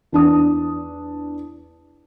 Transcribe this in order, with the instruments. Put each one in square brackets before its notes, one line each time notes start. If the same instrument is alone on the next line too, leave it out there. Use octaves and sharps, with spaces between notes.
[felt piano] E2 D4 D#6